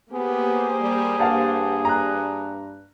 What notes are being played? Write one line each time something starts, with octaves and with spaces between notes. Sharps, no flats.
A#3 B3 G4 G#4 C5
G3
G2 F5 F#5 A5
A#5 F#6